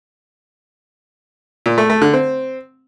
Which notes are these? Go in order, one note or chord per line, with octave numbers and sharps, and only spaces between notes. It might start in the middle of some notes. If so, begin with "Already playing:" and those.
A#2
A3
A3
D3
C4